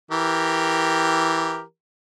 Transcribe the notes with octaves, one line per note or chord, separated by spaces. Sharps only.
E3 G4 A#4